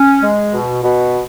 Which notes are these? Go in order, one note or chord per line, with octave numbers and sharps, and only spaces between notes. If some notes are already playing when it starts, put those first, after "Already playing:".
Already playing: C#4
G#3
B2
B2